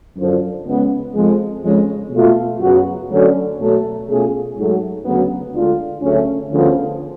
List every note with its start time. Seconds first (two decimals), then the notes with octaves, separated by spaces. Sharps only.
0.17 F#2 D3 F3
0.67 C#2 C#3 G#3 B3
1.15 F2 F3 G#3
1.64 F2 C#3 G#3 C#4
2.12 B2 A3 F4
2.61 F#2 C#3 F#3 B3 F#4
3.10 D2 D3 F#3 C#4
3.59 B2 F#3 A3
4.08 B2 A3 C#4 F4 G#4
4.57 G#2 F#3 A3
5.04 D2 C#3 F#3 B3
5.54 D2 D3 G#3 D4 F4
6.02 D2 C#3 F#3 A3 C#4
6.51 D2 C#3 F3 B3